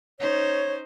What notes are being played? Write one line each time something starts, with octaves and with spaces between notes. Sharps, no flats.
C#4 D#4 C5 C#5